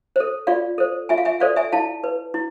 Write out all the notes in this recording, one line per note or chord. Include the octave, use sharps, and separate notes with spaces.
A4 C5
F4 D5 F5
A4 C5
F4 E5 G#5
F5
E5 G#5
A4 C5 D5 F5
E5 G#5
E4 F5 A5
B4
E4